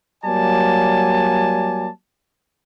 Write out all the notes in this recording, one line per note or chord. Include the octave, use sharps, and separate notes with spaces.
F#3 G3 A#3 D5 G#5 A5